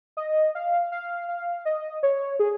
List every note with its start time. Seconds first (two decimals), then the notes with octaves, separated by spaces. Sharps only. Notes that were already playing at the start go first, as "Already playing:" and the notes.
0.17 D#5
0.55 F5
0.92 F5
1.28 F5
1.65 D#5
2.03 C#5
2.39 G#4